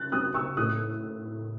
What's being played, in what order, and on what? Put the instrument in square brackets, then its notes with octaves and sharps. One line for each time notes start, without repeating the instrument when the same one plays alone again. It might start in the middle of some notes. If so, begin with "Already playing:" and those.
Already playing: [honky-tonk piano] C#3 F#3 F#6 A6
F#3 C4 D#6 F#6
C#6 E6
A2 D#6 F#6